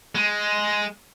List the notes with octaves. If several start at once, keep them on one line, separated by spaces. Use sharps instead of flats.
G#3